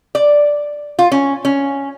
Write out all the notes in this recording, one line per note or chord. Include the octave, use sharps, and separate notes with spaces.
D5
F4
C#4
C#4